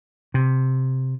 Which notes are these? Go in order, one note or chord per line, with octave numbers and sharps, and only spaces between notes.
C3